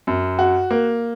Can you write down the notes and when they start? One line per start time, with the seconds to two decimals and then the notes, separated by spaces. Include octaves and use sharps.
0.07 F#2
0.39 F#4
0.71 A#3